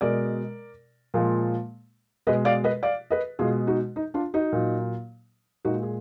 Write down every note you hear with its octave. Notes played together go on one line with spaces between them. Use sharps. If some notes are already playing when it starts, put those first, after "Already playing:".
B2 G#3 A#4 D5
A#2 F3 G#3
B2 G#3 B4 D#5
D5 F5
B4 D#5
D5 F5
B4 D#5
B2 G#3 F4 G#4
D#4 F#4
D#4
D4 F4
D#4 F#4
A#2 F#3
A#2 G#3 D#4 F#4
G#4